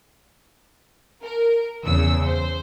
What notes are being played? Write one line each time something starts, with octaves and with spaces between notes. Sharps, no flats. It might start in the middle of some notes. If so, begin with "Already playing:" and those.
A#4
E2 C#3 E6
C5